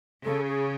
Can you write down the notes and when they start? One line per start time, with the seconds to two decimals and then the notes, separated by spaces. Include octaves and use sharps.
0.25 C#3 A4
0.48 G#4